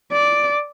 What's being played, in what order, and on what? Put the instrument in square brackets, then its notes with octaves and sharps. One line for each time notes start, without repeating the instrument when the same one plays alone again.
[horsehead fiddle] D5